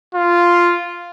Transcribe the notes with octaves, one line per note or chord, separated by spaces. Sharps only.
F4